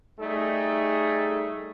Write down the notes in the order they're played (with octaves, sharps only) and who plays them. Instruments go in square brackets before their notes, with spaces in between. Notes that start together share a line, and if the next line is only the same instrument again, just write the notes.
[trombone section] G3 A3 D#4 G#4